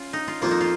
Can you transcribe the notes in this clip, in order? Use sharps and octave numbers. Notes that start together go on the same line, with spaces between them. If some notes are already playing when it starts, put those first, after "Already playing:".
Already playing: C#4 F4
D#4
F4
F2 F3 A#3 F4
D#4
F4